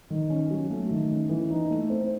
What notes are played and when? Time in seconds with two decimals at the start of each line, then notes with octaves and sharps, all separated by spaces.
0.10 D#3
0.30 C#4
0.51 F#3
0.70 A3
0.91 D#3
1.11 C#4
1.29 E3
1.50 D#4
1.70 A3
1.90 C4